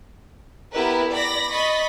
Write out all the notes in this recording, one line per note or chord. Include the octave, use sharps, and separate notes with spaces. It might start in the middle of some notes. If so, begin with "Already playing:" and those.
B3 E4 G4 A#4 B4
D5 B5 A#6
D#5 B5 C#6 A6